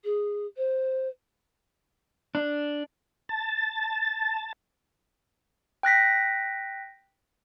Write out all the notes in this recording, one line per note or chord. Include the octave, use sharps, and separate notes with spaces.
G#4
C5
D4
A5
G5 F#6 A#6 B6